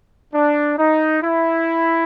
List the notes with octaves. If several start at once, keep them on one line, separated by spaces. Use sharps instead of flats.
D4
D#4
E4